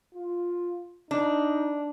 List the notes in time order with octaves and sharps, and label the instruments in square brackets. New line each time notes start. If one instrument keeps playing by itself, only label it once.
[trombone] F4
[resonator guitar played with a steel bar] D4 [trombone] D#4